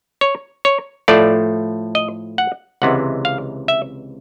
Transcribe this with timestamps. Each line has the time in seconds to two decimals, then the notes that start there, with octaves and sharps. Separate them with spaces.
0.21 C#5
0.65 C#5
1.08 A2 F3 A3 D5
1.95 D#5
2.38 F#5
2.82 C#2 C3 E3 G#3 F#5
3.25 F5
3.68 E5